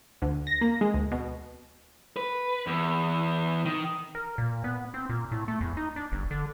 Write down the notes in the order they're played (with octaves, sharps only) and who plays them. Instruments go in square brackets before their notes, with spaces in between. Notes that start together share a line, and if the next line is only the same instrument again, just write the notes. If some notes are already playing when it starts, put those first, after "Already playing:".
[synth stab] D2
A#6
A#3
G#3
D2
B2
[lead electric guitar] B4
E2
D#3
[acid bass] A#4
A#2
B3
C4
A#2
A2
A3
E2
D#4
D4
G1
D3